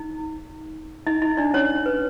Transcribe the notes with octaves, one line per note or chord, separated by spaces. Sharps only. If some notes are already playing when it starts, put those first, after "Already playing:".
Already playing: D#4
D#4 D#5
D#4 D#5
D4 D5
C#4 C#5
B4